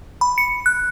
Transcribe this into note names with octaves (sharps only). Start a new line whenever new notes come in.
B5
C#7
F#6